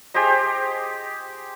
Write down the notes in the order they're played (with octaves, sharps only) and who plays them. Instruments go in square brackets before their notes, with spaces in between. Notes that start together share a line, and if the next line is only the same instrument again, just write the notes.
[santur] G4 G#4 C5 D#5